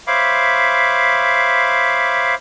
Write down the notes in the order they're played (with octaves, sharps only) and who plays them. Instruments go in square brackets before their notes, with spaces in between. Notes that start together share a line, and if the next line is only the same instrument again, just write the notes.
[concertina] C5 C#5 E5 F5 B5 D6